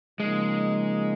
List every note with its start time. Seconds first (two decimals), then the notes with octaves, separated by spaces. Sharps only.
0.19 C#3 F3 G#3 A#3 D#4